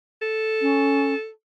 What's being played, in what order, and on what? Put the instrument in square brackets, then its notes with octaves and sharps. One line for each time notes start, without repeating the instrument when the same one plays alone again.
[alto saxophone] A4
[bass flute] C#4